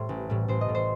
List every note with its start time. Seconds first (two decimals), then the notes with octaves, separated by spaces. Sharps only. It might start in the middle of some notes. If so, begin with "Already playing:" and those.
Already playing: A2 G3 C5 E5
0.09 A1
0.30 A2 G3
0.48 A1 C5
0.61 D#5
0.68 A2 G3
0.75 C5